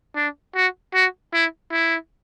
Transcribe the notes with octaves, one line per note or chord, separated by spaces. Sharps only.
D4
F#4
F#4
E4
E4